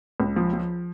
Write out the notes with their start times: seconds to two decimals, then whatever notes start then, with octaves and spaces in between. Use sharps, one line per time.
0.20 C#2
0.36 F3
0.53 F3